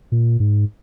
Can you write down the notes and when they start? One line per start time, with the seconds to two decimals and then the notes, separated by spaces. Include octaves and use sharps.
0.12 A#2
0.40 G#2